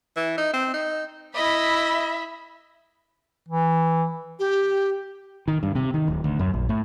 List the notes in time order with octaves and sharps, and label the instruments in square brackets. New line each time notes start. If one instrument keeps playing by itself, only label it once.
[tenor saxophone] E3
D#4
C4
D#4
[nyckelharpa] E4 D#5 [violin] E5 B5
[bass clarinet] E3
[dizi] G4
[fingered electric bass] D#3
G2
C3
D#3
D1
D2
F#2
A#1
A2